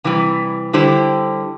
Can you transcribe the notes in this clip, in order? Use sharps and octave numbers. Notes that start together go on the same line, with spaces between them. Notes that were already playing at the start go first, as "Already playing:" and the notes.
C3 E3 G3
D3 G3 E4 G4 C5